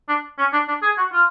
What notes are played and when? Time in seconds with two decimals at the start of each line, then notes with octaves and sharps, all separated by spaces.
0.09 D4
0.38 C#4
0.53 D4
0.68 D4
0.82 G#4
0.98 F#4
1.13 F4